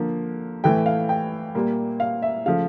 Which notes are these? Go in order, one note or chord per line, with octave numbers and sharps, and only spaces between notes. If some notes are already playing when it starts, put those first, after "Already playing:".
Already playing: D3 F3 A#3
A2 E3 A3 G5
F5
G5
A#2 G3 A#3
F5
E5
C#3 F3 A3 F5